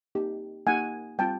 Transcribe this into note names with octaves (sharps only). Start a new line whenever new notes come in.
A#3 D#4 G4
A#3 D#4 G4 F#5 G#5
G3 C4 F4 G5 A5